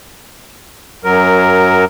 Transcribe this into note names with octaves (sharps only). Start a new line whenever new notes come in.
F#2 F#3 A#4